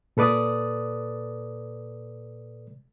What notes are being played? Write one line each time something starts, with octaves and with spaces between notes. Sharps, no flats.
A#2 A4 B4 D5 D#6